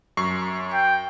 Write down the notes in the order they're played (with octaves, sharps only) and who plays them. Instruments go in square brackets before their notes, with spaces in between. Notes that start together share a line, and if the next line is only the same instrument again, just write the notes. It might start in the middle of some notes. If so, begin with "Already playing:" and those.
[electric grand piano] F#2 C#6 C7
[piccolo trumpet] G5